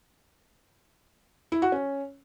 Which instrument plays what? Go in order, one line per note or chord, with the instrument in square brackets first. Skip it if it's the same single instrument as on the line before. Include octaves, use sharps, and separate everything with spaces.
[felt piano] E4
F#4
C#4